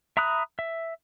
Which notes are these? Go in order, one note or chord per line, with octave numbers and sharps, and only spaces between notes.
E5 A#5 B5 D#6 F#6
E5